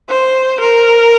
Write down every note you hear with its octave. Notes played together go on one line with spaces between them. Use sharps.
C5
A#4